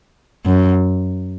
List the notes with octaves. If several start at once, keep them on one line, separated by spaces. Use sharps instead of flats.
F#2